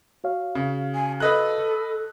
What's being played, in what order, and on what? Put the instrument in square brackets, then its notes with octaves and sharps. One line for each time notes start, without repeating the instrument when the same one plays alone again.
[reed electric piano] F#4 C#5 F5
[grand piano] C#3
[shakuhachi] G#5
[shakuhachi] A4 [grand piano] B4 D#5 F#6